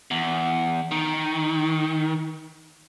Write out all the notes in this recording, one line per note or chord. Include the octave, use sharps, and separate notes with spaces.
E2
D#3